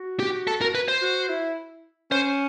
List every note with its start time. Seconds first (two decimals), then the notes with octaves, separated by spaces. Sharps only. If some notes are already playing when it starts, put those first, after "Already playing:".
Already playing: F#4
0.20 G4
0.47 A4
0.61 A#4
0.75 B4
0.88 C5
1.02 F#4
1.29 E4
2.11 C#4 C5